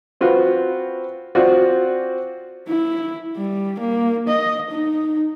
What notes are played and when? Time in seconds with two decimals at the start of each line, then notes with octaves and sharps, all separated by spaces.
0.21 C4 F4 F#4 B4
1.35 C4 F4 F#4 D5
2.68 E4
3.36 G3
3.80 A#3
4.28 D#5
4.71 D#4